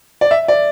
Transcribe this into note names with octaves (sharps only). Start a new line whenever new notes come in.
D5
E5
D5